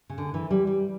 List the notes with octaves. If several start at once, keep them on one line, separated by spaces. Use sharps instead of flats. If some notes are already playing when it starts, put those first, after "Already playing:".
C#3
D3
E3
G3
G3